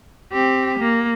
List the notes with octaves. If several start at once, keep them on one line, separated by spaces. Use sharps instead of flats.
C4 G4
A#3